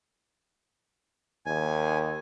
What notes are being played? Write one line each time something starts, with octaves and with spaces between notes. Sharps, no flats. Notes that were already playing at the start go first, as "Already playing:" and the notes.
D#2 G#5